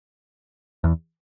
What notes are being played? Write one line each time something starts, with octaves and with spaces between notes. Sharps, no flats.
E2